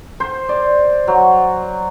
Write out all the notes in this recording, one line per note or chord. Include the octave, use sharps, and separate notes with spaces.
C5
D5
F#3